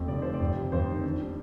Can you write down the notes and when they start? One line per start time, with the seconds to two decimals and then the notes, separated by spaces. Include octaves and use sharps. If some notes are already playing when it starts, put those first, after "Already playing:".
Already playing: F2 F3 A3
0.08 F1 D5
0.22 C3 C5
0.34 D5
0.41 F2
0.56 C3
0.72 F2 C5
0.88 D#3
1.04 D4
1.20 G3